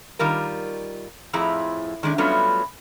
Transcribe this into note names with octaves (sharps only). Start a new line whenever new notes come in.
D#3 G3 F4 A#4
F2 A2 F3 E4 G#4 A#5
D#3 G#3 A3 D4
F#3 G3 A3 B3 C#4 F4